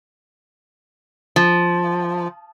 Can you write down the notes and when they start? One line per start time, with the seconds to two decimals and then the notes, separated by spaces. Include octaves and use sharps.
1.36 F3